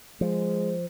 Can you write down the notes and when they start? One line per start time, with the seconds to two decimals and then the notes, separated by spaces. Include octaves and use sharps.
0.21 F3 G#3